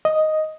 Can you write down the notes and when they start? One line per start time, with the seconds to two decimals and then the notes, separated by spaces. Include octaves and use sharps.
0.05 D#5